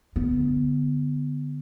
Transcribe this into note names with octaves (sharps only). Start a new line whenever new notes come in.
D3 B3